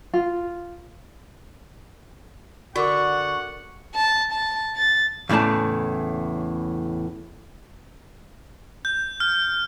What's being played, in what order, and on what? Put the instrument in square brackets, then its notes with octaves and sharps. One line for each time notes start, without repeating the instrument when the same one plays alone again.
[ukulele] F4
[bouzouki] D3 [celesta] F#4 A#4 D6 [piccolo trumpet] F#5 [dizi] C#6
[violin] A5
A5
A6
[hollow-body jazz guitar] E2 A2 C#3 D5 A5
[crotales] G6
F6